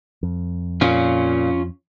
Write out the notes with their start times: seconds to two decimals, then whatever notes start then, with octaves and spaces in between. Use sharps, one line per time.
0.23 F2
0.81 A#2 C#4 F4